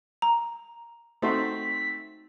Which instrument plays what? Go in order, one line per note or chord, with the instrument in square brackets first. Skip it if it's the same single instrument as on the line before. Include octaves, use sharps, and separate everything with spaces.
[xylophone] A#5
[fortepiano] A3 C4 [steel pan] D#4 F#4 C5 [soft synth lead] B6